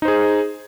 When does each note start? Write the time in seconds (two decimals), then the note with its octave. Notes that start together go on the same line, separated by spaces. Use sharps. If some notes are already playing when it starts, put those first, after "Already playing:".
0.02 D#4
0.05 C5
0.08 G#4